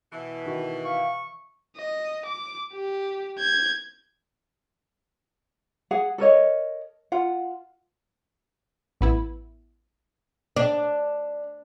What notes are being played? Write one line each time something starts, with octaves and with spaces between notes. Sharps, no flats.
B2 E3
D#3 F#4
F5 C#6
D#5
D6
G4
G6 G#6
G#4 F#5
A4 A#4 C#5 D#5
F4 F#5
A1 B3 E4
D4